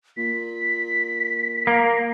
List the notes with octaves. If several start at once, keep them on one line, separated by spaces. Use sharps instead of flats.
A#2 B6
A#3